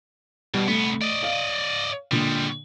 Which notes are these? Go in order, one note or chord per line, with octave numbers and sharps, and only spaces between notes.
B2 G3
C2 A3 B3
D5 D#5
F5
A#2 D3 G3 G#3